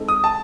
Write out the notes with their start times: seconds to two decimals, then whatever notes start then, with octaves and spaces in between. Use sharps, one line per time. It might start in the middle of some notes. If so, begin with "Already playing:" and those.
Already playing: G#3 C4 D#4 A4
0.08 D#6
0.24 A5